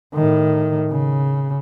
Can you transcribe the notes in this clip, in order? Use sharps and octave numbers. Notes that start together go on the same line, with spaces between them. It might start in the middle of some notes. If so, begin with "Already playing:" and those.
A2 D#3
C#3